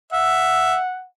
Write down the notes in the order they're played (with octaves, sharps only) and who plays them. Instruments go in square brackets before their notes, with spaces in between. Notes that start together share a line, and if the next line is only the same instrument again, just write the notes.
[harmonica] E5 [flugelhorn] F#5